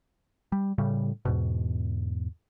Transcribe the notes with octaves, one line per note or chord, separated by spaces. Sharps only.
G3
A2 C#3 G3
E2 G#2 B2